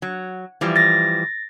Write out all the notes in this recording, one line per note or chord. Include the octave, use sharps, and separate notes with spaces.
F#3
E3 F3 G3
A6 A#6